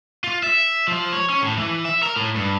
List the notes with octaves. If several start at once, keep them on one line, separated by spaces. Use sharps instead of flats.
F4
E5
F3
C#5
C#4
A2
E3
E5
A#4
A2
G2